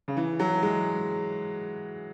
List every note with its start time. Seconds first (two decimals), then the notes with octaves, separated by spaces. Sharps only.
0.08 C#3
0.17 E3
0.40 F#3
0.63 G#3